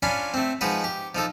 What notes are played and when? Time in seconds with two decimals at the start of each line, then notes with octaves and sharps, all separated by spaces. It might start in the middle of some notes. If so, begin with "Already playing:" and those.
0.02 C#4 D4 F4 G#5 B5 C6
0.34 A3 C4
0.61 F3 G#3 D#4 F#4 B4
0.84 G4
1.15 F3 D#4 A4